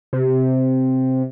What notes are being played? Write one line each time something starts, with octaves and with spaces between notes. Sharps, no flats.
C3